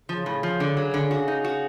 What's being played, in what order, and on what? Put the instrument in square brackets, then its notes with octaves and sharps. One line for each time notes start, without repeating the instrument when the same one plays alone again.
[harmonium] C#3 [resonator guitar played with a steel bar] F3
[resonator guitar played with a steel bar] A2
F3
D3
F#3
D3
F#4
D#4
F#4